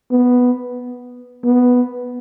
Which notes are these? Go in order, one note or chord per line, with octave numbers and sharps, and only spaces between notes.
B3
B3